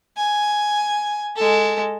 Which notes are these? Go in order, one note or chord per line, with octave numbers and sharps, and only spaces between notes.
G#5
G#3 A4